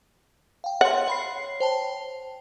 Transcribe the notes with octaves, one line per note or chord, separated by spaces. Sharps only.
F5 G5
C#5 F#5 C6
C#5 B5 C7
C5 G5 A5